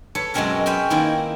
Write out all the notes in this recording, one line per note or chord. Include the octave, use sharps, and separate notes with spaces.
A4 B4 C#5
F#2 B2 G#3 C4 C#4 A#4
C4 C#4 B4 G5 B5
D#3 A#3 C4 D#4 E4